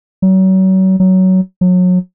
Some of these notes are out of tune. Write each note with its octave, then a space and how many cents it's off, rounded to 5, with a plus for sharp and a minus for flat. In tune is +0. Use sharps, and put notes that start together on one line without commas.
F#3 +35
F#3 +15
F#3 -30